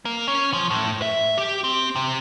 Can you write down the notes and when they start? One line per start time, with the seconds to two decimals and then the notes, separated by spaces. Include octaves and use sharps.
0.05 A#3
0.28 C#4
0.53 F3
0.70 A2
1.02 E5
1.38 G4
1.64 C4
1.96 C3